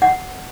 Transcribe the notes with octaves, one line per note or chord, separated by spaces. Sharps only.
F#5